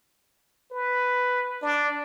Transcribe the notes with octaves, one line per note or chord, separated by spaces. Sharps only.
B4
D4